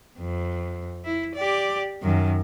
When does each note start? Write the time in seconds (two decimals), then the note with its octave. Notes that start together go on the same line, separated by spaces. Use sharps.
0.19 F2
1.05 E4
1.35 G4 D5
2.02 F#2 D#3